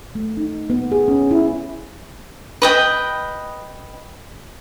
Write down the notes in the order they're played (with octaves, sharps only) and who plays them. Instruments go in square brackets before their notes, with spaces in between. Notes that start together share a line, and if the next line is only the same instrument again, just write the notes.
[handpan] A3
D#4
B3
G#4
C#4
E4
[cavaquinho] B4 D#5 G5